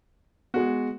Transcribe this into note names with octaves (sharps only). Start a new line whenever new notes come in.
G#3 B3 F#4